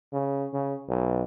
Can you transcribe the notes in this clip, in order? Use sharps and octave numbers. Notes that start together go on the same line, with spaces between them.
C#3
C#3
B1